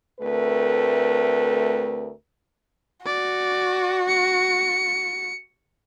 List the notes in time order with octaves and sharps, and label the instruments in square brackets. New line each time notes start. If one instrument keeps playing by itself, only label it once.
[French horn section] D2 A3 C4 A#4 B4
[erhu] F#4 [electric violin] D5
[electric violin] C#7